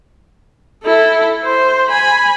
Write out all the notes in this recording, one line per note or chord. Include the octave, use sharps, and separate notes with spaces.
E4 A4
C5
G#5 B5